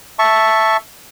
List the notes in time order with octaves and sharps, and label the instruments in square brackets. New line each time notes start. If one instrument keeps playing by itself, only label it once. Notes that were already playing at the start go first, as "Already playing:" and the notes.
[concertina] E5 A5 C#6